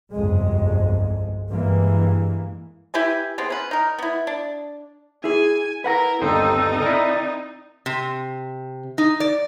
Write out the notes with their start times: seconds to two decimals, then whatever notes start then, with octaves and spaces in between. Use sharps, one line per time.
0.11 G1 C2 F2 G#3
1.51 G2 E3 G#3 A#3
2.94 E4 G4 B4 G#5
3.38 B3 C4 G#4
3.50 C#4 B4
3.71 D#4 A#4
3.98 B3 E4
4.27 D4
5.24 E4 G#4 G#5
5.84 E4 A#4 B4 F#5 A#5
6.22 G1 D#2 C4 D#4 A4 C5
6.82 E4 A#4 D5
7.86 C3
8.98 D#4
9.20 D5